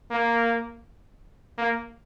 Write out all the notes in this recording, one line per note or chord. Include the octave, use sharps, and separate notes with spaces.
A#3
A#3